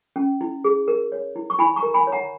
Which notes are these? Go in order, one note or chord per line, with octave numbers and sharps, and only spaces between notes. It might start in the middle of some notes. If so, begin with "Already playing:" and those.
C#4
E4
G#4
A#4
C#5
E4
C#6
E4 G#5 B5
A#5 C#6
A#4
G#5 B5
C#5
F#5 A#5